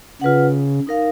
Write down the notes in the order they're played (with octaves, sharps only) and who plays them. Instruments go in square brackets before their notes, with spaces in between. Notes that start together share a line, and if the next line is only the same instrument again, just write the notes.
[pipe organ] C#3 [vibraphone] F4 B4 F#5
[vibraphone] D#4 A#4 F5